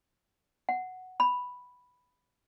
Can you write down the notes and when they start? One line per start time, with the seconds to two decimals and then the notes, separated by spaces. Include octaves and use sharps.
0.69 F#5
1.20 B5